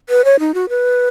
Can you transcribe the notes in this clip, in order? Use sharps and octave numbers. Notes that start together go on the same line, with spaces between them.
B4
C#5
D#4
F#4
B4